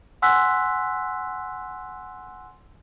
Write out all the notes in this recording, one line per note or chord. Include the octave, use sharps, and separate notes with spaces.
F#5 G#5 C6 E6 F#6 B6